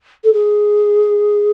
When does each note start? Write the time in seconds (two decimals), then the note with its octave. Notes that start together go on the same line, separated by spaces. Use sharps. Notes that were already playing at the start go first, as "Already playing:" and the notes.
0.24 A4
0.34 G#4